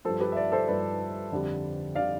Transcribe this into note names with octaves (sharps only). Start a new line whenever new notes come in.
G2 F3 A4 C5
G4 B4
E5
B4 D5
A4 C5
G2 F3 B4 D5
F2 D3 G3
D3 G3 D5 F5